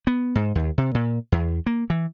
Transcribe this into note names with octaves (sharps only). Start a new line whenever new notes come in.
B3
G#2
D#2
C3
A#2
E2
A#3
E3